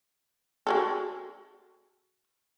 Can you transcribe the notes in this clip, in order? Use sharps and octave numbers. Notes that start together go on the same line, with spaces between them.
F#4 G#4 A4